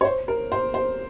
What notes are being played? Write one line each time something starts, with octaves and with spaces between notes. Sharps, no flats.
C#5
C5
A#4
C5
C5